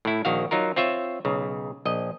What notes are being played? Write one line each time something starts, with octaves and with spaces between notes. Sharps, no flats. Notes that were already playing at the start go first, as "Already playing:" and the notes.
A2 E4
A#1 D#3 F#4 F5
F#3 D#4 F4 A#4
C4 F4 C#5 E5
B1 C#3
A#1 D#5